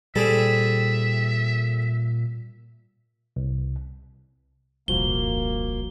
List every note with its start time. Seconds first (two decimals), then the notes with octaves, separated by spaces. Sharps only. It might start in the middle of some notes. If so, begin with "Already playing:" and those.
0.16 A#2 G3 C4 G#4 A4 E5
3.36 C2
4.88 D#1 C2 F2 F3 A#3 F#4 G7